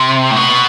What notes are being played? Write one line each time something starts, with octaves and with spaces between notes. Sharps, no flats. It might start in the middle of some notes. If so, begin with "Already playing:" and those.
Already playing: C3
A2
B2